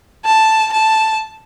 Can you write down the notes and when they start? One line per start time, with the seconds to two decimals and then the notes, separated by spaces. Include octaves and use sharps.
0.25 A5
0.73 A5